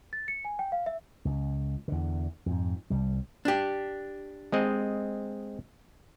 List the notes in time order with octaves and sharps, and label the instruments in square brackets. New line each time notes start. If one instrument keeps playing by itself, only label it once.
[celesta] A6
C#7
G#5
G5
F5
E5
[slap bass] C#2
E2 D3
F2 G#2
C2 G3
[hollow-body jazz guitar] D4 G4
[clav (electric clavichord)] G#3 C4 D#5